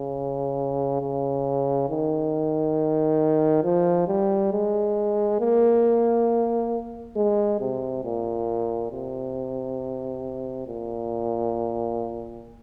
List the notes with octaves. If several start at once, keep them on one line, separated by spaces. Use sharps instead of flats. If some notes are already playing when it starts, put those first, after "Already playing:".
Already playing: C#3
C#3
D#3
F3
G3
G#3
A#3
G#3
C3
A#2
C3
A#2